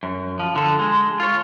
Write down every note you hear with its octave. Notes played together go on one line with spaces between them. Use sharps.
F#2
F3
D3 A4
G#3
F4 C#5